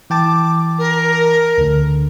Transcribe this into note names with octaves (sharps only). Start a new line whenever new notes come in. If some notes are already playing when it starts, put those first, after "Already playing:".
E3 G5 A5 D6
A#4
D2 D3